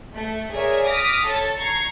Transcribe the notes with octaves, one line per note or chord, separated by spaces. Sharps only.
A3
G#4 A#4 C#5 D5 E5
D6 D#6 F6 A#6 B6
A4 C#5 A5 A6
A#5 C#6 G#6 C7 C#7